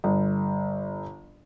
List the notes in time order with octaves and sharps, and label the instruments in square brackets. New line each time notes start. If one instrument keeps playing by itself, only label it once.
[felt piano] G1